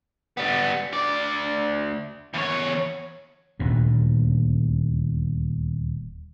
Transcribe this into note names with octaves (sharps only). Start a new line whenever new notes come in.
G3 B3
D2 D5
E2 C#5
D#1 D2 A#2